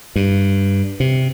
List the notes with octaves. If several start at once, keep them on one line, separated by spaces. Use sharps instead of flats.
G2
C3